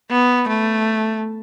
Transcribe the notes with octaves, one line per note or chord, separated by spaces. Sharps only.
B3
A3